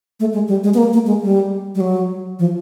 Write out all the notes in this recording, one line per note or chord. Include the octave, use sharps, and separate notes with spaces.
A3
G#3
G3
G#3
B3
A#3
A#3
G#3
G3
G3
F#3
F3